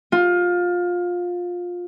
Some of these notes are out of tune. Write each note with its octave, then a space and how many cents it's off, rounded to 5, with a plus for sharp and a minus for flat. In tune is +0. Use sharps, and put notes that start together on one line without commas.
F4 +20